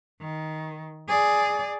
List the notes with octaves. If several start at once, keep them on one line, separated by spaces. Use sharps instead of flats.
D#3
G#4 D5